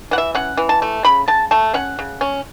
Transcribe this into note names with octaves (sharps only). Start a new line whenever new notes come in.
E3 F#5
E5
C#4 F#5
E3
A5
A3
C#3 B5
C#3 A5
A3 A5
C#4 F#5
C#3
C#4